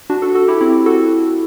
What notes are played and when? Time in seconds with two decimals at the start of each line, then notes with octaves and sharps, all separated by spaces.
0.10 D4 F#4
0.22 F#4 A4
0.35 F#4 A4
0.48 E4 G4
0.61 C4 E4
0.86 F#4 A4